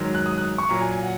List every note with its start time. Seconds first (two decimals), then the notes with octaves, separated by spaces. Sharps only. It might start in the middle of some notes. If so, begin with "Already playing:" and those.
Already playing: G#2 D#3 F#3
0.15 F#6
0.26 D#6
0.38 F#6
0.58 C#6
0.69 A#2 F#3 A#5
0.81 G#5
0.92 G#5
1.03 F#5